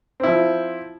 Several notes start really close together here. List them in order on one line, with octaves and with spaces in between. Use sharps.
C4 E4 F3